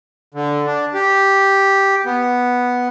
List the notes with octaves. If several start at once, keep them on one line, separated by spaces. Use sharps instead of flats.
D3
D4
G4
B3